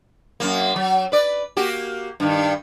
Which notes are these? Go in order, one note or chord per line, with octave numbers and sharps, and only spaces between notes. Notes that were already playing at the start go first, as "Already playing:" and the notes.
F#2 A2 A#3
F#3
B4 D5
A#3 F#4 G4
G2 D#3